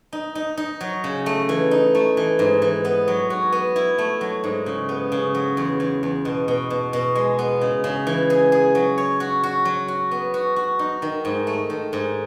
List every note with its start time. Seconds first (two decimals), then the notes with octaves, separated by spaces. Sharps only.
0.13 D#4
0.35 D#4
0.57 D#4
0.81 F#3
1.04 C#3
1.26 A3
1.49 E3
1.71 D#4
1.95 A3
2.17 E3
2.39 G#2
2.62 E3
2.85 B3
3.08 F#3
3.30 F#4
3.53 B3
3.76 E4
3.98 A3
4.21 F#3
4.44 G#2
4.66 C#3
4.89 B3
5.12 C#3
5.35 F#3
5.57 E2
5.80 E2
6.03 E2
6.25 B2
6.48 B2
6.70 B2
6.93 B2
7.15 G#3
7.39 B3
7.61 C#3
7.84 C#3
8.07 E3
8.30 G#4
8.52 G#4
8.75 F#3
8.98 C#5
9.20 F#4
9.43 F#4
9.65 F#3
9.88 F#4
10.11 B3
10.34 F#4
10.56 F#4
10.79 D#4
11.02 D#3
11.25 G#2
11.47 A3
11.70 D#3
11.93 G#2